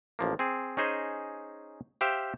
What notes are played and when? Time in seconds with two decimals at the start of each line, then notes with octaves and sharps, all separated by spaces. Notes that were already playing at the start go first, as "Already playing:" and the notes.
0.19 A1 F3 A#3
0.39 C4 G#4
0.77 C#4 D#4 G#4 C5 D#5
2.01 G4 C5 E5 F5 G5